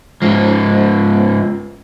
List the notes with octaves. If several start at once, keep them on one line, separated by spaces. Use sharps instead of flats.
G#2 F3